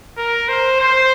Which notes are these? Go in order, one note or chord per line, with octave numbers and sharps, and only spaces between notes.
A#4
C5
C5